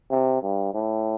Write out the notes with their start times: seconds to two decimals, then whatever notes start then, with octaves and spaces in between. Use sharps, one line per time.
0.11 C3
0.43 G2
0.74 A2